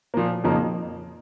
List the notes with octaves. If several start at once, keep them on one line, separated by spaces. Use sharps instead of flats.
A#2 F3 A#3
F2 C#3 F3 A#3 D#4